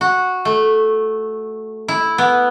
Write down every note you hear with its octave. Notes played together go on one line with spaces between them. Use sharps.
F#4
A3
E4
B3